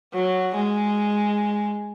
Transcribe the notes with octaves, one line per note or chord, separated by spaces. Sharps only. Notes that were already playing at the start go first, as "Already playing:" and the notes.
F#3
G#3